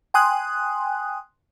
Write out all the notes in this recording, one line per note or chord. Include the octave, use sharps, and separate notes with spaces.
G5 G#5 C6 D#6 F#6